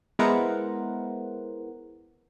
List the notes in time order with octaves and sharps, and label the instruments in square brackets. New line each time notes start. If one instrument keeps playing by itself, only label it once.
[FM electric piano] G#3 B3 E4 A#4 C5 F#5